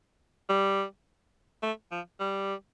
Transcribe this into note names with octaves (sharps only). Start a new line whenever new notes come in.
G3
A3
F3
G3